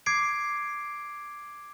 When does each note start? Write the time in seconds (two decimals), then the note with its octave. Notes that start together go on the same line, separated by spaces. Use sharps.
0.06 D6 G#6 C7 D7